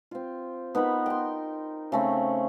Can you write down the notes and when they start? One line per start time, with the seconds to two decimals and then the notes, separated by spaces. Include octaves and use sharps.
0.11 C4 F4
0.75 B3 D#4 A#4 B5
1.06 G5 C6
1.92 C#3 A3 C4